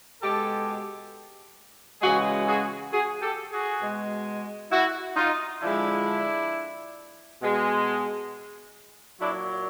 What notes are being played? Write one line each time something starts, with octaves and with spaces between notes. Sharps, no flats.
B2 G#3 G4 A4
C#3 E3 G#3 F#4 G#4
F#4 G#4
F#4 G#4
G4 A4
F#4 G#4
B2 G#3
E4 F#4
D#4 F4
D3 F3 G#3 D4 E4
B2 G#3
A#2 F#3 D4 E4